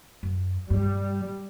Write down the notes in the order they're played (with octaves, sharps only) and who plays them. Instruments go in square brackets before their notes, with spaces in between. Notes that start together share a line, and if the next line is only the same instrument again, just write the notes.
[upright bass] F#2
[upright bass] G2 [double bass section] G3